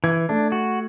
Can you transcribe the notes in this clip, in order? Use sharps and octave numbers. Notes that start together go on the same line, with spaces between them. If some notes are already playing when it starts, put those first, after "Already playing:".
E3 G#6
A3 D4
F#4